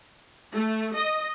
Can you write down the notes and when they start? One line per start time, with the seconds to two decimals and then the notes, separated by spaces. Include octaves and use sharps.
0.55 A3
0.96 D#5